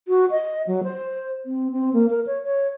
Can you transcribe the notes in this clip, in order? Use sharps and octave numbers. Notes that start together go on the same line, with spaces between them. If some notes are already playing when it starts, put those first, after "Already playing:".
F#4
D#5
F#3
C5
C4
C4
A#3
A#4
C#5
C#5